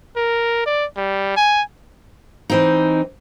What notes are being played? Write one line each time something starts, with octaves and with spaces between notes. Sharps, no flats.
A#4
D5
G3
G#5
E3 C4 D#4